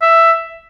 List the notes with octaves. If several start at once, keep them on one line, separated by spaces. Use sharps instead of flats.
E5